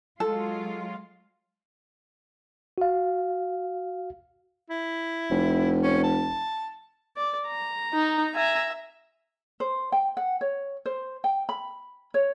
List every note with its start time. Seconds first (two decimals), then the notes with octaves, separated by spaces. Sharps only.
0.20 F#3 G#3 F4 A4
2.78 F#4 F5
4.70 E4
5.30 F1
5.83 C#4
6.04 A5
7.17 D5
7.47 A#5
7.93 D#4
8.35 E5 G#5 A#5
9.60 C5
9.92 G5
10.17 F#5
10.41 C#5
10.86 C5
11.24 G5
11.49 B5
12.14 C#5